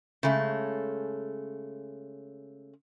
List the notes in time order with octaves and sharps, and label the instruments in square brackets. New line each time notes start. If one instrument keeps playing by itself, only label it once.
[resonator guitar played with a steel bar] C#3 G#3 A3